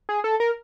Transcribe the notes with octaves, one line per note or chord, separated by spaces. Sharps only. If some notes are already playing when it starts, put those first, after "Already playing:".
G#4
A4
A#4